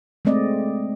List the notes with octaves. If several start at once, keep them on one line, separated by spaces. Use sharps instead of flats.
G#3 A3 C4 D5 D#5